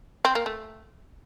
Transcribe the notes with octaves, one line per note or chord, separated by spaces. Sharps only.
C4
A#3
A3